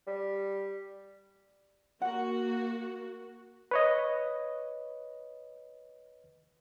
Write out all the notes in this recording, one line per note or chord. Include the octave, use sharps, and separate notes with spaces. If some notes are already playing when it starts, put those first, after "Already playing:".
G3
A#3 F#4 A#4 F#5
B4 C#5 D#5